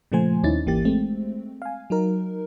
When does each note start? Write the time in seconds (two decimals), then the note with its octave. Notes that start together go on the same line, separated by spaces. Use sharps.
0.12 A#2 C#3 F3 A3 C5 G#5
0.43 D#2 C#4 D#4 E4 A6
0.66 G#1 E3 A#3 G4 A6
0.85 G#3 A3 C4
1.62 F5 G#5
1.90 F#3 D#4 A#4